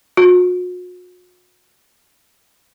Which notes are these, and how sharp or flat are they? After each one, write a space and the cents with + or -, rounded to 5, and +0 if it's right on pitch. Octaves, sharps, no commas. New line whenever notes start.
F#4 -45